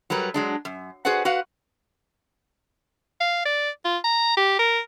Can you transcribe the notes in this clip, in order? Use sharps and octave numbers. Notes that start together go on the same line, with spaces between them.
F#3 G3 A#4 B4
F#3 G#3 D4
F#2
F#4 G#4 B4 C5 D5 F#5
F#4 B4 F5 F#5
F5
D5
F4
A#5
G4
A#4